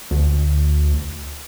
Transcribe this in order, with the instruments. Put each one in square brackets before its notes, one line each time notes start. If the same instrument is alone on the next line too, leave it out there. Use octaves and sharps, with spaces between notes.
[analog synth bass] D2